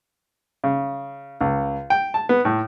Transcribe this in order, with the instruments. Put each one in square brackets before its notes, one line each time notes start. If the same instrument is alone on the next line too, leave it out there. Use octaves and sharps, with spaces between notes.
[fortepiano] C#3
C#2
G5
A5
B3
A2